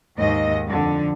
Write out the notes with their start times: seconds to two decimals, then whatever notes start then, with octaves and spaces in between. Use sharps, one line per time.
0.17 D#2 G#2 D#5
0.66 F2 D3